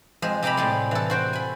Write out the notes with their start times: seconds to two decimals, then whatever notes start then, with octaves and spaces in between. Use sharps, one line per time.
0.22 F2 G#3 C5
0.42 C3 G4 C5 A#5 B5
0.57 A2 G3 G#3
0.91 E3 A4
1.10 F#4 C5 G5
1.33 G#5 B5